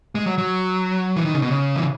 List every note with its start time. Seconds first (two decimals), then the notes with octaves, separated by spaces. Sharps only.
0.15 G#3
0.26 F#3
0.38 F#3
1.16 E3
1.25 D#3
1.34 C#3
1.42 B2
1.51 C#3
1.76 E3